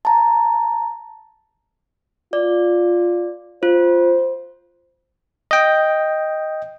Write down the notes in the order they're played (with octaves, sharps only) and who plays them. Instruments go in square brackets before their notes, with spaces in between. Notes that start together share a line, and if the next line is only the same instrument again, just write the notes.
[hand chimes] A5 A#5
[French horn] F4 [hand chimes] D5
[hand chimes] F4 [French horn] C5
[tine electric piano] D#5 G5